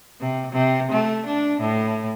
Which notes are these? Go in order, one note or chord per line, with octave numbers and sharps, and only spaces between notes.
C3
C3
A3
D4
A2